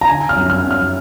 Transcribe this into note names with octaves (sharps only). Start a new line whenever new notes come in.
A#5
D3 G#5
F6
F#2
F6
F#2
F6